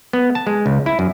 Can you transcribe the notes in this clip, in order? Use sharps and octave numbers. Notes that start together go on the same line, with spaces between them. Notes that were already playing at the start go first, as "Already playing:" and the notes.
B3
A5
G#3
C#2
E4
F#2